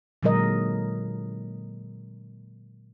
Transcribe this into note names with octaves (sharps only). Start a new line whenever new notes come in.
A#2 D3 F#3 G#3 A#4 D#5